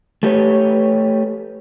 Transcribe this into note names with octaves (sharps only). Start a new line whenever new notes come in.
A3 G4 B4 C#5